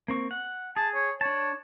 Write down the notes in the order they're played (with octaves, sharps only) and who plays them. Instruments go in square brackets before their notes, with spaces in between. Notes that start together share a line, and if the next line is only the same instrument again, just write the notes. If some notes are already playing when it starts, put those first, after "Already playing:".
[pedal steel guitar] A#3 C4 C#6
F#5
[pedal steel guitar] G#4 [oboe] A5
[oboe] C#5
[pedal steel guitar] D4 A5 [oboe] C#5